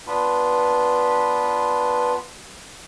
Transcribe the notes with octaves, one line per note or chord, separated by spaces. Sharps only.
B3 D4 F4 B4